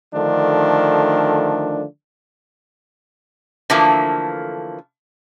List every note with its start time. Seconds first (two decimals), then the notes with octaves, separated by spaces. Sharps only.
0.14 D3 D#3 F3 A3 D4
3.70 D3 E3 F3 A3 A#3